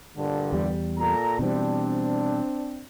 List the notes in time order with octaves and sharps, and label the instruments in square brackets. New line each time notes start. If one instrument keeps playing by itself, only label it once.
[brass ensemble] G2 A#2 D3
[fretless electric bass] E2 G3
[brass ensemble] A#2 A4 A#5
[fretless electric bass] B2 E3 G3 [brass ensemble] C4 D4